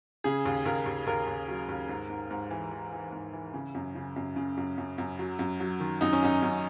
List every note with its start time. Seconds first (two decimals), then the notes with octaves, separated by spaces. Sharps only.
0.24 C#3 G#4
0.45 D#2
0.66 D#2 A#4
0.86 D#2
1.07 D#2 A#4
1.27 D#2
1.48 F#3
1.69 D#2
1.89 G#2
2.10 G#2
2.31 G#2
2.51 E3
2.72 E3
2.92 E3
3.12 G#2
3.33 E3
3.54 C#3
3.75 F#2
3.95 C#3
4.16 F#2
4.36 C#3
4.57 F#2
4.78 F#2
4.98 F#2
5.19 F#3
5.39 F#2
5.60 F#3
5.80 D#3
6.01 F#2 D#4
6.13 C#4
6.22 F#2 D#4
6.43 F#2